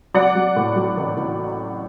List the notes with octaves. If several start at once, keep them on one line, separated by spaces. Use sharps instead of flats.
F#3 D5 F#5
F#3
A2
F#3
A1
A1